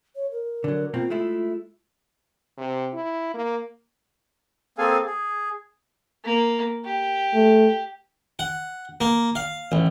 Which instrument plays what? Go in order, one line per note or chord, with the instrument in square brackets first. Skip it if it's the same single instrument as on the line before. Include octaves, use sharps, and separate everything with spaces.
[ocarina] C#5
A#4
[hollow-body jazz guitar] D3 F#3
[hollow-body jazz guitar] B2 A#3 C4 [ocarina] F4
[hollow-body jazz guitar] G#3 A3 E4
[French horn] C3
E4
A#3
[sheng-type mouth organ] A#3 C4 G#4 A4 F5 G#5
G#4
[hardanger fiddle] A#3
G4
[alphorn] A3
[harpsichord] F#5
A#3
F5
A1